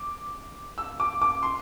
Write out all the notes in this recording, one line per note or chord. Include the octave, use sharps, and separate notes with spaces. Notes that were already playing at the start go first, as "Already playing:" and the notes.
Already playing: D6
E6
D6
D6
C6